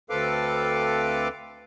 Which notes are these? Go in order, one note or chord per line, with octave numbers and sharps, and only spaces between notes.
D2 C4 A4 B4 F5 D6